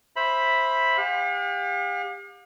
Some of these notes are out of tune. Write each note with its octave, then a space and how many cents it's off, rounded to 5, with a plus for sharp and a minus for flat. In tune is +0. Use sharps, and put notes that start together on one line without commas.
C5 +15 E5 +0 B5 +0
G4 +35 F5 +45